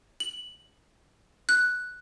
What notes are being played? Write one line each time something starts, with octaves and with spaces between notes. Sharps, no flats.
F#7
F#6